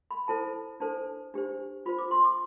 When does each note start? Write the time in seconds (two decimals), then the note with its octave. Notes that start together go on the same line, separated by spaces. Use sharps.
0.11 B5
0.28 E4 A4 C5 A5
0.80 D4 A4 C5 A5
1.34 D4 G4 C5
1.86 F4 C5 B5
1.99 D6
2.11 C6
2.25 D6